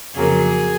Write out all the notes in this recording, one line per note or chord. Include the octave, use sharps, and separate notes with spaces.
F2 C#3 F#3 A#3 G#4